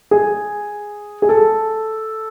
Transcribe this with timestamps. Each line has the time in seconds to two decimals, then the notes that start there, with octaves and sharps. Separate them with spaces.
0.11 G#4
1.22 G#4
1.29 A4